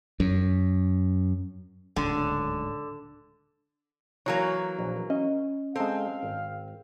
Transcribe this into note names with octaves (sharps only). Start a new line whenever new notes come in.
F#2
D1 C#2 G#2 D3
E3 F#3 A#3 C#5
A#1
C#4 D#5
G#3 C4 A4 F5
G#1